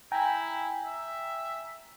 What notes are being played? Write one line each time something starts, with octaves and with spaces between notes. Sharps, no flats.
E4 G5 G#5 A#5
E5